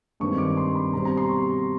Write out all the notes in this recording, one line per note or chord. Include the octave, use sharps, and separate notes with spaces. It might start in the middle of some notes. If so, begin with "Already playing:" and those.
G2 D#3 G#3 C4 C#6
D6
C6
B5
B2 G3 C4 A#5
A#5
C6
C#6